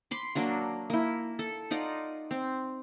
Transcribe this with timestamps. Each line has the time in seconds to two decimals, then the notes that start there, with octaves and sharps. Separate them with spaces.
0.11 B5 C6 D6
0.35 F#3 A#3 D4 F#4
0.90 A#3 E4
1.39 A4
1.71 D#4 F4 D5 F#5
2.31 C4